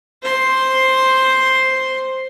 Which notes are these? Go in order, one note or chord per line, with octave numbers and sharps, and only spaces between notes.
C5 C6